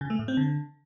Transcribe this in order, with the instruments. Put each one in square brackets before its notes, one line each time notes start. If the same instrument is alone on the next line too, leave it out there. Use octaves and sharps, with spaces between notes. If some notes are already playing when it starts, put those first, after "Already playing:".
[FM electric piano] C#3
A3
A2
C4
D3